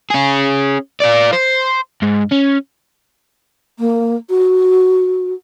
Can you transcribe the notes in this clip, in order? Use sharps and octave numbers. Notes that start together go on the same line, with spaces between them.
C#4 G#4
F4 D5
C5
G#2
C#4
A#3
F#4